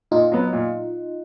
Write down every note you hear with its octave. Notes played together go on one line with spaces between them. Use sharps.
A#2 D#4 F4
F#3 B3
A#2